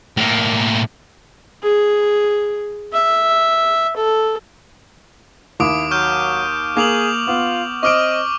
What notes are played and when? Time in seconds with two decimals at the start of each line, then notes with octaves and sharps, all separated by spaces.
0.17 A2 A#3
1.63 G#4
2.93 E5
3.97 A4
5.60 D#2 E4 D6 D#6 D7
5.91 F#3 C#6 F6 G6
6.77 A#3 G#4 D6 F7 F#7
7.28 B3 F4
7.83 C4 D#5 C#6 D6 F6 D7